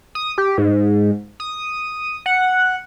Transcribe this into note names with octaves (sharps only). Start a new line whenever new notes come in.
D#6
G4
G#2
D#6
F#5